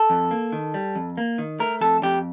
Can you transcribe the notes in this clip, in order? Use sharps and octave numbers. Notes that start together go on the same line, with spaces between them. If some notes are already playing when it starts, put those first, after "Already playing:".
Already playing: A4
F2
A#3
D#3
G3
F2
A#3
D#3
A3 A#4
F2 A4
F2 G4